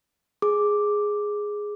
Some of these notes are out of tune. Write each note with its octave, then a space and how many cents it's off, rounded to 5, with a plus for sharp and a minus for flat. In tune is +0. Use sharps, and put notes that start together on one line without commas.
G#4 +0 D6 +0